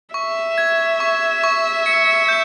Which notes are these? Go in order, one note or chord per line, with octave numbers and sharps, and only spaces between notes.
E5 C#6
G#6
C#6
C#6
C#7
G6